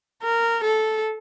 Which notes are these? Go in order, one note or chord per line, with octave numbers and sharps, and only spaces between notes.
A#4
A4